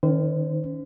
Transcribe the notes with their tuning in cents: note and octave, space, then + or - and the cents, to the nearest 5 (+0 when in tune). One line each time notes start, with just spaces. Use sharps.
D#3 +0 C#4 +20 C5 -35